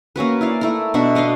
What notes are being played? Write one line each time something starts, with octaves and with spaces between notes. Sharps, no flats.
A#3 C#4 F#4 B4
E4 D5 F5
A3 E4 A#4
B2 D4 F#4 E5
B3 D4 D#5 F5